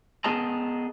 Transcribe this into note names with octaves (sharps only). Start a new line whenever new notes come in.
B3 G#4 D#5 A5 A#5